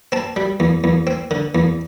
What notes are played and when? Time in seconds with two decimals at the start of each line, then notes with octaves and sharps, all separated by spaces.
0.12 C4 A5
0.36 G3
0.60 E2
0.84 E2
1.07 C4
1.31 D3
1.55 E2